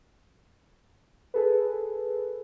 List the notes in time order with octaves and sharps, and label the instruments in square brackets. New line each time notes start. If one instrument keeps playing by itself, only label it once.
[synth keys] G#4 A4 B4